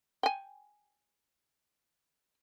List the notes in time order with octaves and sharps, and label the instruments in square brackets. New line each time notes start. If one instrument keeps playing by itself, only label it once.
[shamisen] G5 G#5